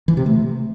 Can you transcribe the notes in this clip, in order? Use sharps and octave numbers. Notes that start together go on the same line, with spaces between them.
E3
C3
A3